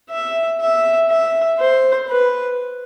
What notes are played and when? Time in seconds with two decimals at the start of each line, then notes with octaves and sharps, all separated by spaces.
0.11 E5
0.61 E5
1.10 E5
1.59 C5
2.09 B4